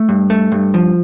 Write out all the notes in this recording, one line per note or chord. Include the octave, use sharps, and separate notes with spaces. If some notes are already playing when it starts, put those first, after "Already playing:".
Already playing: A3
G2
A3
G2
F3